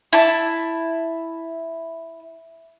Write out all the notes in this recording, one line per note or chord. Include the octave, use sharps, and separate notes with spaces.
E4 A5